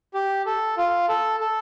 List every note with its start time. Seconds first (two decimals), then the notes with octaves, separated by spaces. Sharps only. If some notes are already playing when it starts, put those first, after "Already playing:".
0.14 G4
0.46 A4
0.77 F4
1.09 A4
1.40 A4